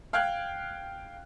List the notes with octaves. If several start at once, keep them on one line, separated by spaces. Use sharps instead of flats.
F5 G5 F6 F#6 G#6